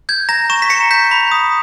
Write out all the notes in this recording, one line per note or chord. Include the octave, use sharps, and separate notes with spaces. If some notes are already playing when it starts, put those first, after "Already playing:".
G6 G#6
A#5 A#6
C#6 E7
B6
A#5 C#7
G6 B6
B5
D#6